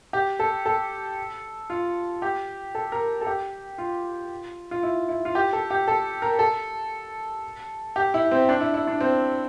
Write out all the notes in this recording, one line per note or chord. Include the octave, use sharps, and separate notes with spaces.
G4
A4
A4
F4
G4
A4
A#4
A4
G4
F4
F4
E4
E4
F4
G4
A4
G4
A4
A#4
A4
G4
E4
C4
D4
E4
E4
D4
C4